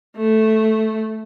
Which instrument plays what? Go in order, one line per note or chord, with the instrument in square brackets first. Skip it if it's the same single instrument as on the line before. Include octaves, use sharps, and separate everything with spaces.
[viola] A3